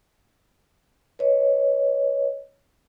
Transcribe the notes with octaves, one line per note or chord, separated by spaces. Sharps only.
B4 C#5 D#5